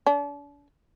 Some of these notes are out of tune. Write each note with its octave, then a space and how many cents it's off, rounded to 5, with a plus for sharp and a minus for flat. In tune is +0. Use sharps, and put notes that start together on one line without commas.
D4 -40